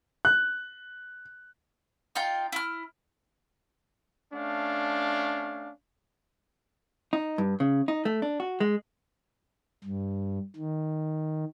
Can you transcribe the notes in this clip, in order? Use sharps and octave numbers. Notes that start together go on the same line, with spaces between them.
F#6
D#4 F4 G5
E4 F6
A3 C#4 D4 F5
D#4
G2
C#3
D#4
A3
D4
F#4
G#3
G2
D#3